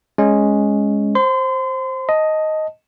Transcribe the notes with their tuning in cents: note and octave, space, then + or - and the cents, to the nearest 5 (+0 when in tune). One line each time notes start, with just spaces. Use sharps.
G#3 +0 C#4 +0
C5 +10 C6 -35
D#5 +5 A5 +0